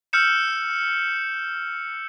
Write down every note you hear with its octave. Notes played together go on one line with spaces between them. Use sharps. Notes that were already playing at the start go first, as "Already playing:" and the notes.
E6 F6 G6 C#7 E7